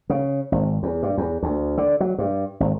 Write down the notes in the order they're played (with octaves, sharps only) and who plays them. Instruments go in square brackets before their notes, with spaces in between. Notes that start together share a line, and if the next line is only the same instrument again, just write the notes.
[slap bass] C#3
G#1
E2
G2
E2
D2
D3
F#3
G2
G#1